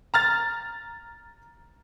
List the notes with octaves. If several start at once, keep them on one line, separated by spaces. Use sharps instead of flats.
A#5 F6 A6